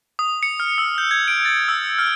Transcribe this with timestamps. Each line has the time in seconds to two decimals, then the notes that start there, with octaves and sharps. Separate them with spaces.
0.19 D#6
0.43 C#7
0.60 F6
0.78 E6
0.98 G6
1.11 G#6
1.28 D7
1.45 A6
1.68 E6
1.99 F6